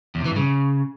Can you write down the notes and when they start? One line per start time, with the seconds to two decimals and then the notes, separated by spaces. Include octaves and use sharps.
0.15 E2
0.20 C3
0.25 E3
0.31 G2
0.36 C#3